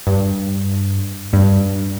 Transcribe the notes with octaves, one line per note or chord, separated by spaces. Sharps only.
G2
G2